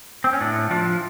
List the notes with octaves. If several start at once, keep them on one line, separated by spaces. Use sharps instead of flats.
C4
C#4
A2 D4
F3 D4